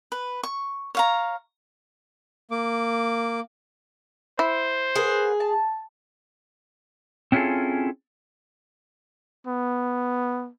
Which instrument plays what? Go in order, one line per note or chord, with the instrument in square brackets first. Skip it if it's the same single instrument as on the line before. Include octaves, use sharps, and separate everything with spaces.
[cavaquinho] B4
C#6
C#5 F5 A#5
[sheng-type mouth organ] A#3 D6
[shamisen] E4 [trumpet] C5
[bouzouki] G#4 [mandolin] A#4 B4 F#5
[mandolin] A5
[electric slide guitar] C4 C#4 E4 F4 G#4 A4
[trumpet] B3